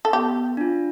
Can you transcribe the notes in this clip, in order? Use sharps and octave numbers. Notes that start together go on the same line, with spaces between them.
A4
B3 G4
D4 F4